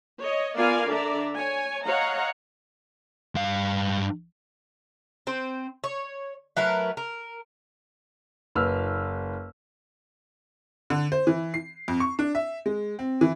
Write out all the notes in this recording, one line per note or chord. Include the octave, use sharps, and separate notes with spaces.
C#5 D#5
B3 F4 A#4 D5 F5 G#5
D3 D4 D5 E5 A#5
C#5 G#5
C#5 D#5 F5 F#5 A#5
G2 F5
C4 C5
C#5
F#3 A3 A#4 B4
A#4
F#1 B4 E6 F6
D3
C5
E3
C7
F2
C#6
D4
E5
G#3
C4
E3